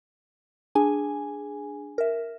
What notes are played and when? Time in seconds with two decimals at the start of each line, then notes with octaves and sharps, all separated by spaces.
0.75 D4 G#4 G#5
1.98 A#4 E5